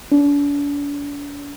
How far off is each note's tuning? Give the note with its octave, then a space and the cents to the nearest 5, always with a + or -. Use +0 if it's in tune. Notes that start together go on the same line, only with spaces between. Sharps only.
D4 -40